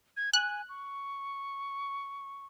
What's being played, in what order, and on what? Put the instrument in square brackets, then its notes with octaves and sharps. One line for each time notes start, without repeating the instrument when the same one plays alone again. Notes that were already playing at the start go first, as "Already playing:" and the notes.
[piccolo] G#6
[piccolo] G#5 [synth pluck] F#6
[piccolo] C#6